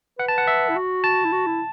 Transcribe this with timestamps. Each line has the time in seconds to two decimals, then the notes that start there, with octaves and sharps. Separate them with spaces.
0.19 B4 F#5
0.28 A5
0.38 F#5
0.47 E5
0.69 E4
0.76 F#4
1.04 A5
1.25 E4
1.32 F#4
1.46 E4